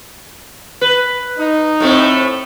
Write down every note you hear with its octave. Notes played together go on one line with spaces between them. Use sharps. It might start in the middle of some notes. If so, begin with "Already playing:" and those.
B4
D#4
A2 A3 C4